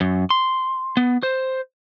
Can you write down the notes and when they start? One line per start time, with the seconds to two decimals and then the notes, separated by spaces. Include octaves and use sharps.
0.01 F#2
0.30 C6
0.97 B3
1.23 C5